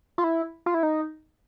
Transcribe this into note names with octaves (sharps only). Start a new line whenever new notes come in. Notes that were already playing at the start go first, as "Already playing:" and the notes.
F4
E4
F4
E4
D#4